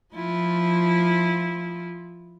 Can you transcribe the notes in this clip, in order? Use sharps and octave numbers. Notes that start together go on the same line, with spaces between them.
F3 E4 F4